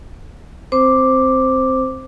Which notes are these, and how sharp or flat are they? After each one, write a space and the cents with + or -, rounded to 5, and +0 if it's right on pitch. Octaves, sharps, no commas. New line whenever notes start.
C4 +0 C5 +0 D6 +0